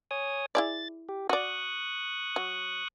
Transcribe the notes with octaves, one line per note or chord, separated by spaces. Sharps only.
C#5 G#5 D#6
E4 G#4 D5 A6
G4
F#4 D5 C#6 D#6 F#6
F#3